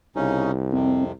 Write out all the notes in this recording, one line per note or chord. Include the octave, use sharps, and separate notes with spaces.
C2 C#3 C#4 D#4
F2 C3 C4